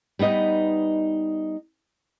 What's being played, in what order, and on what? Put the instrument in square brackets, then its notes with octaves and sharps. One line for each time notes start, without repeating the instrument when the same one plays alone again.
[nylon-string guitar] G3 B3 D#4 D#5